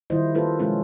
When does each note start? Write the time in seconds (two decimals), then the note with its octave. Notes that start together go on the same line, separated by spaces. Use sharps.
0.10 D#3 G3 E4 F4 C5 D#5
0.35 A#3 F4 A4 B4 C5
0.59 B2 F3 G#3 C#4 F4 A4